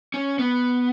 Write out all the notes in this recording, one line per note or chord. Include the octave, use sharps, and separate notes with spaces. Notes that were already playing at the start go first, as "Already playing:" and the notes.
C#4
B3